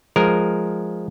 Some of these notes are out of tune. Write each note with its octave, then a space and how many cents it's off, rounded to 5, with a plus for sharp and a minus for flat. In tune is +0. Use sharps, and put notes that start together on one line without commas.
F3 +0 G#3 +0 A#4 +0